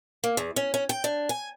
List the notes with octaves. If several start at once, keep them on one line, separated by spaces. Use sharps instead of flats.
A#3
E2
C#4
C#4
G5
D4
G#5